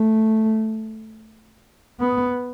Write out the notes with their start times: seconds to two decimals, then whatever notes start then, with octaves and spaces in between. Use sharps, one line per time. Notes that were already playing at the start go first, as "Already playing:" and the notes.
Already playing: A3
2.00 B3